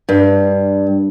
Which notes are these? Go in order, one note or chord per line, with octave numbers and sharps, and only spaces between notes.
G2